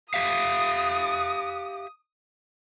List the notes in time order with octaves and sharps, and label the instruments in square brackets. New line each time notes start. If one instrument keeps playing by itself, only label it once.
[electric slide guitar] G4 E5 F5 [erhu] D#6